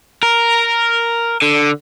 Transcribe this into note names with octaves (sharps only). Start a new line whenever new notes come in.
A#4
D3